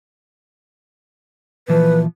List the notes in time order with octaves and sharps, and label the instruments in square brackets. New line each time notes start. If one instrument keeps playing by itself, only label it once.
[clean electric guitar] A#2 E3 F3 [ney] B4